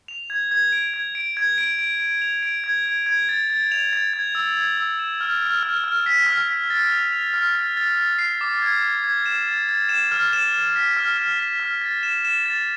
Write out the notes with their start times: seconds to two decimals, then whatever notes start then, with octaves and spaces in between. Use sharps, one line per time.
0.08 F7
0.30 G#6
0.51 G#6
0.72 D7
0.94 G#6
1.15 D7
1.37 G#6
1.58 D7
1.79 D7
2.00 D7
2.22 F7
2.43 D7
2.64 G#6
2.86 G#6
3.06 G#6
3.29 A6
3.50 A6
3.72 F7
3.93 A6
4.13 G#6
4.35 E6
4.57 G#6
4.78 E6
4.99 E7
5.21 F6
5.42 F6
5.63 F6
5.84 F6
6.06 B6
6.27 F6
6.48 B6
6.70 A6
6.92 F7
7.13 F7
7.34 F6
7.55 A6
7.77 A6
7.97 A6
8.19 C7
8.41 D6
8.62 G#6
8.83 G#6
9.04 G#6
9.26 E7
9.47 A6
9.69 A6
9.89 E7
10.11 F6
10.33 E7
10.54 E7
10.76 B6
10.97 F6
11.17 F6
11.39 B6
11.60 F6
11.82 A6
12.03 E7
12.25 E7
12.46 A6